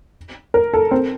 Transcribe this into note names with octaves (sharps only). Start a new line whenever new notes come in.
A#4
A4
C4